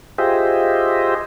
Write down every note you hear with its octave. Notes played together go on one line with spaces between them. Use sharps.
F4 G4 G#4 C5 D#5 E5